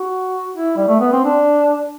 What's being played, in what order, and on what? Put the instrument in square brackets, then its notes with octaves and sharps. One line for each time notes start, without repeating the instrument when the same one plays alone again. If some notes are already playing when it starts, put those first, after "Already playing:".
Already playing: [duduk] F#4
E4
G3
A3
B3
C4
D4